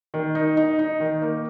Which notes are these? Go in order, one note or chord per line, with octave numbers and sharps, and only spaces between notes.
D#3
D#4
D#4
D#4
D#3
A#3